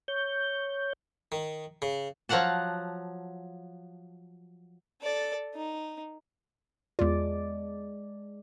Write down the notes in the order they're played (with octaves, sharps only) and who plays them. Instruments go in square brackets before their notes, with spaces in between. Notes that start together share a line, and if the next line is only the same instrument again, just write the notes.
[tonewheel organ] C#5 G6
[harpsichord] D#3
C#3
[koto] F3 F#3 F5 F#5 A5
[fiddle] A4 D5
D#4
[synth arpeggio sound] E2 F4 [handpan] G#3 D5